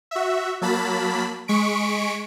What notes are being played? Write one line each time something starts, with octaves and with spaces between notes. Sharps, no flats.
F#4 E5
F#3 A#3 A5 B5 B6
G#3 C#6 B6 D7